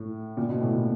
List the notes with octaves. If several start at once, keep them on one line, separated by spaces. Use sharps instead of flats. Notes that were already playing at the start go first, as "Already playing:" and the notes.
Already playing: A2
A#2
B2
A2
A#2